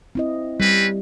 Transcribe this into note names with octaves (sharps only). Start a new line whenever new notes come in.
C4 E4 D#5
G3 C4 C#4 B4